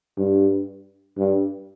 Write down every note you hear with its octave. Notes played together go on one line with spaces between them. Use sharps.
G2
G2